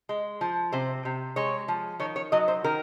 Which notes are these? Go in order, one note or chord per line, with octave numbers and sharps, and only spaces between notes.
G#3
F3
C3 C5
C3
G#3 C#5
F3
D#3 C#5
C#5
F#3 D#5
C5
D#3 A#4